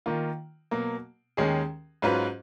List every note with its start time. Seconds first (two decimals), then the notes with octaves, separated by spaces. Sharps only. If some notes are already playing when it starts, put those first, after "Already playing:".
0.06 D#3 A#3 F4
0.71 B2 F#3 A#3
1.37 D#2 D#3 G#3 C#4 G#4
2.02 G#2 F#3 C#4 F4 B4